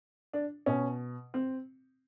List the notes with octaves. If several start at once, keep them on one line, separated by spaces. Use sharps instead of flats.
D4
B2 C#4
C4